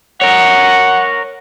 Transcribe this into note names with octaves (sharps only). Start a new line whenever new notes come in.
A#4 C#5 F#5